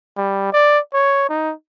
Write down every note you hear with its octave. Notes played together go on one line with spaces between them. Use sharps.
G3
D5
C#5
D#4